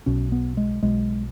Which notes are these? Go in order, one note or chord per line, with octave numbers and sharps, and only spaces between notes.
B1 B2 C#4
B3
G#3
B1 B2 G#3